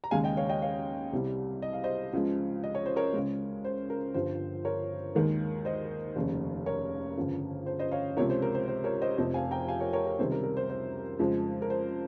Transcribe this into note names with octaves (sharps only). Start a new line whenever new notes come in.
A#5
D#2 C#3 G#3 F5 G#5
D#5 G5
C#5 F5
D#5 G5
C#5 F5
C2 C3 G3
D#5
F5
C5 D#5
C#2 C#3 F3 G#3
D#5
C#5
C5
A#4 C#5
C#2 C#3 G#3
C5
A#4
G1 G2 F3 C5
A#4 C#5
D#2 D#3 G#3
C5 D#5
F1 D#2 C#3
A#4 C#5
G1 F2 C#3
C5
C5 D#5
C#5 F5
C#2 C3 F3 G#3 A#4 C#5
C5
A#4
C5
C5
A#4 C#5
C5 D#5
F1 F2 C3 C5 D#5
F5 G#5
G5 A#5
F5 G#5
A#4 C#5
A#4 C#5
A#4
C#2 C3 D#3 G3 C5
A#4
A#4
C5
C5
F2 C#3 F3 G#3
A#4
C5